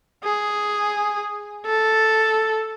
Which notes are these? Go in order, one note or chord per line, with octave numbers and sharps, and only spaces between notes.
G#4
A4